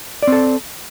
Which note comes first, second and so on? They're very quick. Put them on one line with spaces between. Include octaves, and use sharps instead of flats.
D5 C4 A4